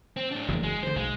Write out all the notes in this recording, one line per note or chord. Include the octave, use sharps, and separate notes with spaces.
C4
A2 D4
F#1 E2 F#3
G#3
D3 D#3 C5
B1 G#3